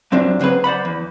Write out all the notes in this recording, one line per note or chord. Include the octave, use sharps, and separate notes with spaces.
G2 F#3 C4 D4 F4 E5
C#3 F#3 C4 G#4 B4
C5 D5 F#5 B5
E2